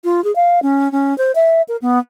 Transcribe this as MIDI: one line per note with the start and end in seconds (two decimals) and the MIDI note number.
0.04 0.23 65
0.24 0.34 68
0.36 0.60 77
0.62 0.91 61
0.92 1.16 61
1.18 1.32 72
1.35 1.62 76
1.68 1.77 70
1.82 1.99 59